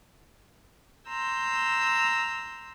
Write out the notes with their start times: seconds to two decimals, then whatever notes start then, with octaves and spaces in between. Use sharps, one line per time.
1.09 A#5 C6 E6 G6